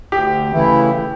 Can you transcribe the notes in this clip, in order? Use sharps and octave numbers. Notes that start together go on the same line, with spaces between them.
D2 G4
C#3 E3 A3 E4